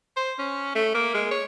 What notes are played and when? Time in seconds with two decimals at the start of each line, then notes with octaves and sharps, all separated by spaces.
0.16 C5
0.38 C#4
0.75 A3
0.94 A#3
1.14 G#3
1.31 C#5